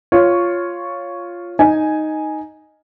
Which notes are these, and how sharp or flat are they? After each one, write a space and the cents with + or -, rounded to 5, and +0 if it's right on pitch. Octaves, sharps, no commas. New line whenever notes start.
F4 +0 C#5 +0
D#4 +0 G#5 +0